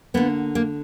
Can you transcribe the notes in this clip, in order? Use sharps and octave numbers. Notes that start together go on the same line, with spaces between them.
D3 A#3 B3
A#3